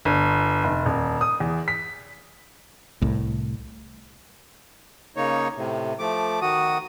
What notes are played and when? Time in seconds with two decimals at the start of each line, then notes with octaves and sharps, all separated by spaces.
0.05 G1
0.64 F1
0.85 D#1
1.21 D#6
1.40 E2
1.68 B6
3.02 C2 A2
5.17 C#3 A#3 D#4 C#5
5.56 A2 C3
5.99 F3 A3 D6
6.42 D#3 F#4 D#6